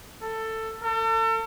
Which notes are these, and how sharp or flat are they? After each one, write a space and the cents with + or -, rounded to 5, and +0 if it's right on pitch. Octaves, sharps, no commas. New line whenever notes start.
A4 +15
A4 +40